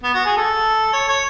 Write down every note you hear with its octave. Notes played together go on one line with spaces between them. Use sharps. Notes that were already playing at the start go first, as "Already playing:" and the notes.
B3
F#4
G#4
A4
C#5
C#5